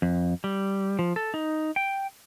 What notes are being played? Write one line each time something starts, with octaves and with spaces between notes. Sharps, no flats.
F2
G3
F3
A4
D#4
G5